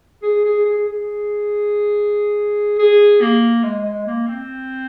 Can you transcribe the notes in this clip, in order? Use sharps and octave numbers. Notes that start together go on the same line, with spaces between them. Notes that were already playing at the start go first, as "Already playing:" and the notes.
G#4
G#4
G#4
G#4
G#4
A#3
G#3
G#3
A#3
C4